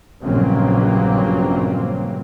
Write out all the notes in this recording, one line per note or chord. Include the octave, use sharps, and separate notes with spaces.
A#1 G2 C#3 F#3 A#3 C4